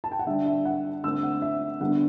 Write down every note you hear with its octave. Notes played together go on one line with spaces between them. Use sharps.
A5
G5
F#5
D3 G3 D4 E5
E5
F#5
D3 A3 C4 E6
F#5
E5
D3 G3 B3 D4 F#5